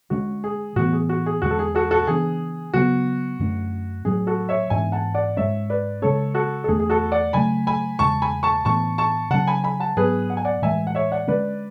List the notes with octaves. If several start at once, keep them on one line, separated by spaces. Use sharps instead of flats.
D3 G#3 C#4 F#4
G#4
A2 E3 B3 F#4
G#4
F#4
G#4
E2 D3 G#3 F#4
A4
G#4
F#4 A4
F#4 A4
C#3 E3 B3 D4 G#4
C#3 F#3 B3 F#4
F#2 D3 A3 C#4
A2 F#3 C#4 G#4
F#4 A4
C#5 E5
G#2 E3 B3 D4 E5 G#5
F#5 A5
D5 F#5
G#2 G#3 C#4 C#5 E5
B4 D5
C#3 G#3 C#4 A4 C#5
F#4 A4
A4
E2 D3 A3 G#4
G#4
F#4 A4
D5 F#5
C#3 F#3 A3 G#5 B5
G#5 B5
E2 C#3 G#3 A5 C#6
G#5 B5
A5 C#6
A2 E3 B3 D4 A5 C#6
A5 C#6
C#3 F#3 C#4 F#5 A5
G#5 B5
G#5 B5
F#5 A5
G#2 F#3 B3 G#4 B4
F#5
G#5
D5 F#5
A2 E3 G#3 E5 G#5
F#5
C#5 E5
D5 F#5
D3 G#3 C#4 B4 D5